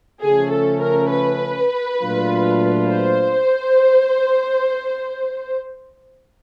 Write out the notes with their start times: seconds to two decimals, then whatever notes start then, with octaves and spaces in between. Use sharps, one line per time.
0.22 C#3 F3 A3 C#4 G#4
0.51 A4
0.81 A#4
1.10 B4
1.99 A#2 F#3 A3 D4 F4
2.89 C5